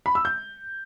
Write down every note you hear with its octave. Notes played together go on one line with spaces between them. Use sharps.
B5
E6
G6